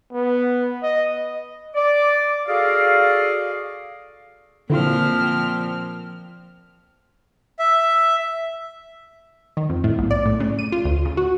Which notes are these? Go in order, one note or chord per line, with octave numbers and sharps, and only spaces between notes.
B3
D#5
D5 D6
F#4 G#4 A4 D5 D#5 F5
A#2 D3 F3 C4 E4 F4 F6
E5
D#3
F2
A2
B1
D5
A2
C#3
D#7
F4
D2
C#3
F#4